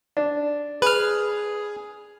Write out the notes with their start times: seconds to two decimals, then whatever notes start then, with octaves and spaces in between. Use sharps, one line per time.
0.17 D4
0.82 G#4 B4 F6